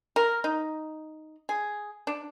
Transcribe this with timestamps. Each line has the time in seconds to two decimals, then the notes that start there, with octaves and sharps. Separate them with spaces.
0.16 A#4
0.44 D#4
1.49 G#4
2.07 D4